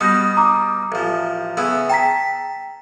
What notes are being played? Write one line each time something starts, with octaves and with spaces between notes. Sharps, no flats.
B2 G3 B3 D#6 G6 A#6
A#5 D6 D#6
A1 F3
C#3 B3 E4
G5 A5 A#5 B6